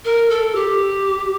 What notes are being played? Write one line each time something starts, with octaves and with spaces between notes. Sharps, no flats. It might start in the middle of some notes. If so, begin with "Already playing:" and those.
A#4
A4
G4